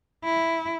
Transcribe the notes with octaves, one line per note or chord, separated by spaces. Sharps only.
E4